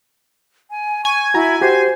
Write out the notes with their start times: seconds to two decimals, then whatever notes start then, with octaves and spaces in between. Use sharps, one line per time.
0.70 G#5
1.05 G#5 C#6
1.34 E4 F#4 A#5
1.61 F#4 G4 C5